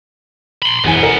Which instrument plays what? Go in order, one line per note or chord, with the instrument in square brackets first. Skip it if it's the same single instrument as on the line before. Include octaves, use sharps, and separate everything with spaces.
[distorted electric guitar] B5 C6
[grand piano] E1 E3 G#5 [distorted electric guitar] F#2 B3
[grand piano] A#4